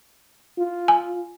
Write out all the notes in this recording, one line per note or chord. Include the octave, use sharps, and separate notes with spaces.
F4
G#5